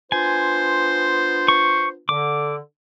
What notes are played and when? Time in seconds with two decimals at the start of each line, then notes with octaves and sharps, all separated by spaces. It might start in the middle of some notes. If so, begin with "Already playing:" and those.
0.12 B3 D4 F4 C5 G#5
1.48 C#6
2.09 D3 D6